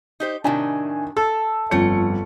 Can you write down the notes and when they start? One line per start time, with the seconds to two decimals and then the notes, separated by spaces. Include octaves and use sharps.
0.20 D#4 G4 C5
0.44 A2 C3 D#3 D4 G#5
1.17 A4 E6
1.71 G1 F2 A3 C#4 C#7